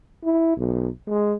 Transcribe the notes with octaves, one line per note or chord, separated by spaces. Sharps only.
E4
B1
G#3